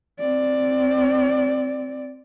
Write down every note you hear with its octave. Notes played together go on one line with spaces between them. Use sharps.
C4 D5